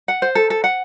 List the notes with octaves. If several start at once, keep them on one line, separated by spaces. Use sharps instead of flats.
F#5
C5
A4
A4
F#5